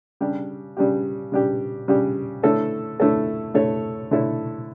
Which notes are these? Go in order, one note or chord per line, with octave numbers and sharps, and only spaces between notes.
C#3 G3 D4 G4
C#3 G3 D4 G4
C#3 G3 D4 G4
C#3 G3 D4 G4
D3 A3 E4 A4 C#5
D3 A3 E4 A4 C#5
D3 A3 E4 A4 C#5
D3 A3 E4 A4 C#5